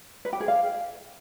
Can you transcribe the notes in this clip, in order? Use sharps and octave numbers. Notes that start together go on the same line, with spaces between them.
B4
G4
G#4
F5